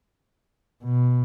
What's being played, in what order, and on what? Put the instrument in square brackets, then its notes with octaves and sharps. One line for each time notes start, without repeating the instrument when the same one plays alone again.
[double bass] B2